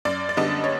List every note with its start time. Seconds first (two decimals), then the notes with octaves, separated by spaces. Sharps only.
0.05 F#2 D5
0.29 D5
0.37 D3 G3 B3 D4 D#5
0.64 C#5